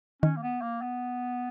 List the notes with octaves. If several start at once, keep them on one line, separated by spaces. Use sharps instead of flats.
D#3 C#4
A#3
B3
A#3
B3